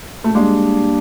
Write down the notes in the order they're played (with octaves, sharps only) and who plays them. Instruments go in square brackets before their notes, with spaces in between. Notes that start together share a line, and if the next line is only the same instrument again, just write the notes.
[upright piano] A3
[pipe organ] G3 A#3 D4 G4 [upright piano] G#3